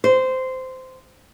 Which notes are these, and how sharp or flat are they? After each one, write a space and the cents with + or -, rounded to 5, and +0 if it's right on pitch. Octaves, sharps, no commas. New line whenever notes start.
C5 -15